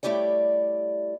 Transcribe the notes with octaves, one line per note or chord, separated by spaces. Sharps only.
G3 A3 E4 G4 C#5 D5